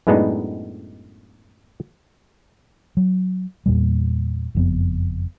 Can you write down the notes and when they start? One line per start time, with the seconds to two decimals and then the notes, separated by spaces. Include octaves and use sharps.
0.07 F#2 A2 G#3 B3 D4 D#4
2.97 F#3
3.66 E2 A#2 G3
4.55 F#1 F2 B3